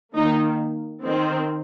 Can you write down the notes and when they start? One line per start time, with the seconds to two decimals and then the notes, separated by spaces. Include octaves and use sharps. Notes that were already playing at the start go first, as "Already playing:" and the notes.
0.15 D#3 A#3 D#4
1.03 D#3 C4